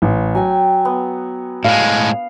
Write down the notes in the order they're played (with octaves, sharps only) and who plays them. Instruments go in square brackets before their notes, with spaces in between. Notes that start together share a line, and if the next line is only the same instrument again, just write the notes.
[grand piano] A1
[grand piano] F#3 [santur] G5 G#5
[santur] B3
[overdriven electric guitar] A2 G#3 [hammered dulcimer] F5